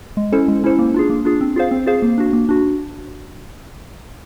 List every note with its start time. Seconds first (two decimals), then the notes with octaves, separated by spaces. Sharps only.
0.17 G#3
0.32 C#4 E4 A4 C5
0.48 G#3
0.64 C#4 E4 A4 C5
0.79 A#3
0.94 D4 F4 G#4
1.10 A#3
1.25 D4 F4 G#4
1.41 C4
1.56 F4 G#4 C5 F5
1.71 C4
1.86 F4 G#4 C5 F5
2.02 A#3
2.18 D4 F#4
2.33 A#3
2.49 D4 F#4